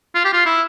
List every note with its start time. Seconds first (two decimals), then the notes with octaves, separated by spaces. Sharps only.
0.15 F4
0.25 G4
0.33 F4
0.46 E4